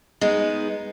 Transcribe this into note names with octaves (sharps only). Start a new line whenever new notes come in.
G#3 B3 D#4